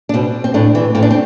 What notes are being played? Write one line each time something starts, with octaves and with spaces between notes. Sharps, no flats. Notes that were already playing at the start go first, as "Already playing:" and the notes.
D4
B2 C4
C4
A2 D4
E3
A2 C4
D4
C4